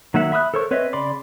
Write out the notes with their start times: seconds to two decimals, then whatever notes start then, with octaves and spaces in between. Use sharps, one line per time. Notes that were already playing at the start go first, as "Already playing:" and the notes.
0.14 D#3 F#3 A#3 E5 F#5
0.32 E5 B5 D#6 E6 F#6
0.54 A4 A#4 C5 C#5 C#6
0.71 C4 B4 C#5 D#5 E5
0.93 C#3 D5 B5 C6 D6